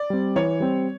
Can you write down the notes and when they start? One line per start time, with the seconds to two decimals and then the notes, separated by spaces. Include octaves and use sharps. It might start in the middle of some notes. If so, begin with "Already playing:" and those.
Already playing: D5
0.10 G3 C4
0.36 E3 C#5
0.60 G3 C4